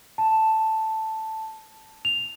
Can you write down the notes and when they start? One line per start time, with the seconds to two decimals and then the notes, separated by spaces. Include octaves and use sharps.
0.18 A5
2.05 F7